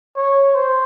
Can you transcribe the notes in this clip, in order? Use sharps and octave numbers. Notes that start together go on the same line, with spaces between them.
C#5
C5